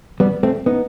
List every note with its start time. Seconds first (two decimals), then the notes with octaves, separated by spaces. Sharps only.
0.20 G3 B3
0.43 A3 C4
0.66 B3 D#4